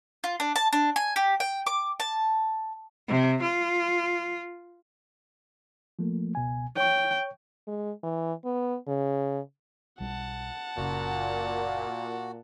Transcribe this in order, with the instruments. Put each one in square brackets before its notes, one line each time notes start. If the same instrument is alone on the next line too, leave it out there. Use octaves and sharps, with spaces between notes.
[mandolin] F4
D4
A5
D4
G#5
G4
G5
D6
A5
[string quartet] C3
F4
[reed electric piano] F3 A3 A#3
C#2 B2 G#5
[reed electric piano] C#5 C#6 [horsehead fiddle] G5
[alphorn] G#3
E3
B3
C#3
[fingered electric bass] B1 G3 [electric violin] F#5 A5
[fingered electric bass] F#1 C#3 [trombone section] A#2 [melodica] F#4